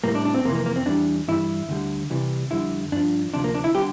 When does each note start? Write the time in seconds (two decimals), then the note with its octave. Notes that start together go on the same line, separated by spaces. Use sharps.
0.04 A2 G3 A#3
0.15 D4
0.25 D4
0.34 C4
0.45 F2 C3 E3 A#3
0.55 A#3
0.66 A#3
0.76 C4
0.86 E2 E3 G3 D4
1.28 G2 E3 G3 E4
1.68 D2 D3 G3
2.10 C2 C3 E3 G3
2.51 F2 D3 G3 E4
2.92 G2 F3 D4
3.34 D2 C3 F3 D4
3.44 A#3
3.55 D4
3.64 E4
3.75 D3 G3 G4